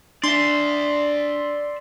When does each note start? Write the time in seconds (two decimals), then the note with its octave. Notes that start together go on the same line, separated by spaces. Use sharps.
0.24 D4 D5 E5 C6